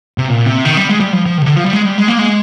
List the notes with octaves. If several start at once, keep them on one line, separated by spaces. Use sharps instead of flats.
C3
A#2
C3
D#3
G3
G#3
G3
F3
F3
D#3
C3
D3
F3
G3
G#3
G3
G#3
A#3
G#3